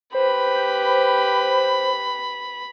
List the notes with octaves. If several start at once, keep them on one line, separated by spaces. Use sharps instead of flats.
G4 B4 C5 B5